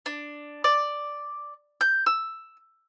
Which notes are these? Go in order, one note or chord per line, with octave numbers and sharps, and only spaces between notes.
D4
D5
G6
E6